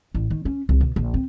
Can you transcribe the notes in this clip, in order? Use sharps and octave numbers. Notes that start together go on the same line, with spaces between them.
A1
D#3
C#4
C2
B2
A#1
C4